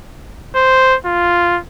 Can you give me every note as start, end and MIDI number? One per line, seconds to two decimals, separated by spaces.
0.55 0.96 72
1.06 1.59 65